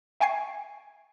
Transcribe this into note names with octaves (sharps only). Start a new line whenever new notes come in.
E5 G5 G#5 C#6 G#6 C7